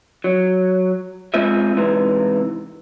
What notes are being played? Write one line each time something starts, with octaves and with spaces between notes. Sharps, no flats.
F#3
G#3 C4 F4 C5 D#5 E5
G#2 C3 E3